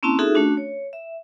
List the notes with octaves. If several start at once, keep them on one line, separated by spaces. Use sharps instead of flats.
A#3 C4 C#4 E4 A5
D#4 F4 F#4 G#4 A4 E5
A3 C#4 D4 F#4
C#5
E5